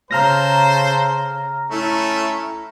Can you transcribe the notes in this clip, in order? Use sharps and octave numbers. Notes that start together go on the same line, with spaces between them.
C#3 A4 C5 A#5 F6 A#6
A3 C#4 E4